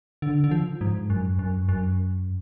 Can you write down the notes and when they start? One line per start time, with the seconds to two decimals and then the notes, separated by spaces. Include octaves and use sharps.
0.22 D3
0.44 D3
0.51 F3
0.81 G#2
1.10 F#2
1.39 F#2
1.69 F#2